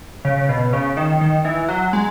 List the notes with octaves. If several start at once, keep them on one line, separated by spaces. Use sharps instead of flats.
C#3
B2
C#3
D#3
D#3
E3
F#3
G#3